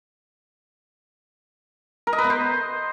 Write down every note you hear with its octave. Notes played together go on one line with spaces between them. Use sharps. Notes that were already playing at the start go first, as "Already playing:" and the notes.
A#4
D#5
B4
B3
C5